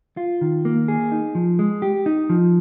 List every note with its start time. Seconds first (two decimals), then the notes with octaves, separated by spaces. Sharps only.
0.17 F4
0.41 D#3
0.65 A#3
0.88 G#4
1.12 D#4
1.35 F3
1.59 G#3
1.82 G4
2.06 D#4
2.30 F3